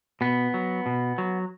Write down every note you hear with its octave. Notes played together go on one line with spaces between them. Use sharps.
B2 B3
F#3
B2
F#3